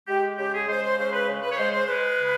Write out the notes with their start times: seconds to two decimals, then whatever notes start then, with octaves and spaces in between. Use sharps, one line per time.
0.08 G#3 G4
0.38 C#3 G4
0.53 G#4
0.68 G#3 C5
0.83 C5
0.98 C#3 C5
1.12 B4
1.28 C#3
1.42 B4
1.51 C#5
1.58 G#3 C5
1.73 C5
1.87 G#3 B4
2.18 C#3